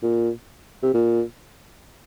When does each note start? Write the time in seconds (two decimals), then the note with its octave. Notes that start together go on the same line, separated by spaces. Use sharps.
0.03 A#2
0.83 C3
0.94 A#2